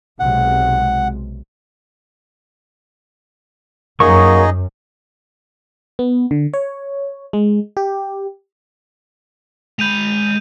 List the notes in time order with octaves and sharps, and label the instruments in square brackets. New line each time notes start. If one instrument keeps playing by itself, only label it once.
[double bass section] B1 C3 G#3 [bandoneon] F#5
[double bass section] F#2 [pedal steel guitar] F#3 C#6 [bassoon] A#3 [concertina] D#4 G#4 D#5
[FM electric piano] B3
D3
C#5
G#3
G4
[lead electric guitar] G#3 B5 [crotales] G6 D#7 F7